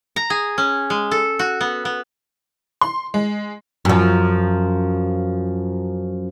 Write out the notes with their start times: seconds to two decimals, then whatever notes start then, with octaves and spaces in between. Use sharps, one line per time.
0.16 A#5
0.30 G#4
0.58 C#4
0.90 G#3
1.11 A4
1.39 F#4
1.61 B3
1.85 B3
2.81 C6
3.14 G#3
3.85 F#2 F3